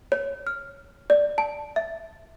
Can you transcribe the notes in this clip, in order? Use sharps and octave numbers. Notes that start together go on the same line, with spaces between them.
C#5
F6
D5
A5
E5